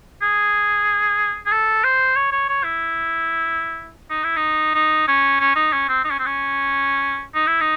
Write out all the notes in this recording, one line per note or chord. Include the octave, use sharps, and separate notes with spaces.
G#4
G#4
A4
C5
C#5
C#5
C#5
E4
D#4
E4
D#4
D#4
C#4
C#4
D#4
C#4
C4
D#4
C#4
C4
C#4
D#4
E4
D#4